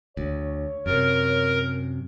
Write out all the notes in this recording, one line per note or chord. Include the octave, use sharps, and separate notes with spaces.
D2 C#5
F#2 C3 A#4